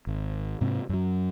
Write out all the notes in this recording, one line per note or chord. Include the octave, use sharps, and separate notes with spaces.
G#1
G#2 C3
F#2 F#3